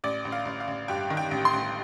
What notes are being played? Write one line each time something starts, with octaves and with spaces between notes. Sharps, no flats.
A1 D5
A1
F5
A1
F5
A1
G2 G5
D#3
G5
A1
C6
A1